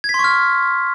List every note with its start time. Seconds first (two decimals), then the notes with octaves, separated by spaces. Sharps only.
0.04 G#6
0.09 B6
0.14 C6
0.19 C#6
0.24 F6